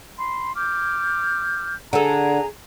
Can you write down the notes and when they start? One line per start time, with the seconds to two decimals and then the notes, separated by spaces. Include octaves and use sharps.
0.18 B5 C6
0.55 D6 F6 G6
1.93 D3 G#4 A4 G#5 A#5